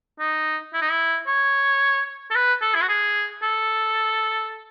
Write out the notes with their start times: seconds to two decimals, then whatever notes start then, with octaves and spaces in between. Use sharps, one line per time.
0.19 D#4
0.74 E4
0.81 D#4
0.91 E4
1.27 C#5
2.31 A4
2.35 B4
2.62 A4
2.75 E4
2.81 F#4
2.89 G#4
3.43 A4